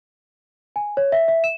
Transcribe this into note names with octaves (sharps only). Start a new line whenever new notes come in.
G#5
C#5
E5
E5
E7